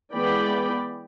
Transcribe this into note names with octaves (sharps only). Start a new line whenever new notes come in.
E3 G#3 B3 D5 G5 B5